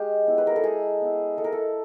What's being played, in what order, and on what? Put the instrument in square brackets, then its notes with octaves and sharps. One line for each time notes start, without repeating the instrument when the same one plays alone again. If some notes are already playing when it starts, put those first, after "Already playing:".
Already playing: [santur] G#3 G4
B3 E4
B4
A#4
A4
G#3 G#4
B3 E4
G#3 A4
A#4
A4